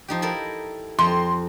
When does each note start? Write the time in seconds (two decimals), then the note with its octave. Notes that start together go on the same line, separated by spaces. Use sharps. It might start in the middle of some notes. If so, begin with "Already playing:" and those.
0.08 F3 D#4 G4
0.22 E4 A4 A#4
0.99 F2 A#5 C6